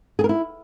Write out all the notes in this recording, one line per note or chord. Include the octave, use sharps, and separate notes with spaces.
G#4
A#4
E4